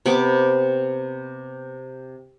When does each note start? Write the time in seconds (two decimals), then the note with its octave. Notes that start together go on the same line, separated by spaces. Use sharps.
0.06 C3 B3 C#6 D6